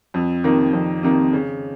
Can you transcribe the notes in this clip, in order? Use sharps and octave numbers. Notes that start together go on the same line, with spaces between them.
F2
C3 D#3 A#3
F2
C3 D#3 A#3
C#3